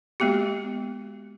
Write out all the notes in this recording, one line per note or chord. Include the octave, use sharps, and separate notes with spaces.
G#3 A#3 B3 F#4 G4